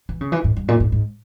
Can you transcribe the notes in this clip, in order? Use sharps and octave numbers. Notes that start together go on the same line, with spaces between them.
E3
C#3
E3
G#2
G2
A#2
G#2
G#2